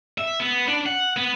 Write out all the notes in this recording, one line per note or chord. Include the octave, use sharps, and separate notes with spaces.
E5
B3
D4
F#5
B3